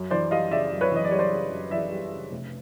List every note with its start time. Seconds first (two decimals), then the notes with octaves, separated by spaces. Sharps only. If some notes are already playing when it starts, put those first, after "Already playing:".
Already playing: F#2
0.11 E3 C5 D5
0.31 G3 D#5 F5
0.51 C#3 D5 E5
0.72 F#2
0.81 B4 C#5
0.92 E3 D#5
1.05 D5
1.11 G3 C#5
1.19 C5 D5
1.32 C#3
1.51 F#2
1.71 E3 D5 E5
1.92 G3
2.12 C#3
2.32 F1